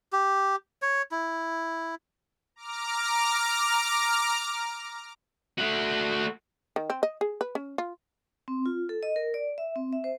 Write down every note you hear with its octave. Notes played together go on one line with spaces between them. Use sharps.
G4
C#5
E4
A#5 D6 F6
A3 F#4
D#3
C4
D#5
G#4
B4
C#4
F4
C4
F4
A4
D#5
A#4
D5
E5
C4
E5
C5